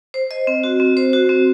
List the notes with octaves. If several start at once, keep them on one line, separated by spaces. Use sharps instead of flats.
C5
D#5
C4
F#4
C4
C5
F#4
C4